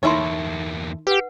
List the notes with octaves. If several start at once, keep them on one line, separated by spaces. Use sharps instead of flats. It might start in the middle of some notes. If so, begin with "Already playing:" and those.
E2 A#3 D#4 E4 A4 A#4 C#5 C6
G4 B4 F#5